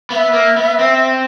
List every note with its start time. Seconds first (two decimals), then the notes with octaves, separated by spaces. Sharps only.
0.10 B3 F5
0.15 E5
0.33 A#3
0.56 B3
0.79 C4